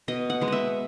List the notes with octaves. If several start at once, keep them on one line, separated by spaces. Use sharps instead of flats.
B2 D#5
F#5
G#3 B3
D#5 E5